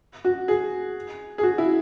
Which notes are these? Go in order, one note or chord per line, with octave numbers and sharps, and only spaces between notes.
F#4
G#4
G#4
F#4
E4